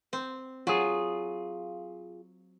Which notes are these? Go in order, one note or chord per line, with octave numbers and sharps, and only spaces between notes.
C4
F#3 F4 G#4